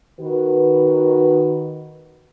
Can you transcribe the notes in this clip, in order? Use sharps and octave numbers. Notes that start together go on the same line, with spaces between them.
D#3 F#4 B4